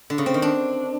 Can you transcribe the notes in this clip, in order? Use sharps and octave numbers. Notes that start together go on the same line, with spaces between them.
D3
C#3
C4
D#3
D4